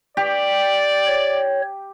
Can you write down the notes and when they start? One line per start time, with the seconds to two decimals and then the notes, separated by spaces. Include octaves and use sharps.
0.17 G4 D5
1.06 C#5